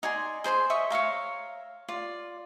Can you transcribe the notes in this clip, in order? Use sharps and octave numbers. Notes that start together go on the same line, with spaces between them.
D#4 D5 G#5 C6
G#4 C5 A#5 C6
C#5 D#5 E5 C#6
C#5 E5 F5 A#5
F4 D5